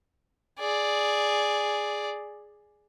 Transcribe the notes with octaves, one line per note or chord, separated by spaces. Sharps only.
G#4 D5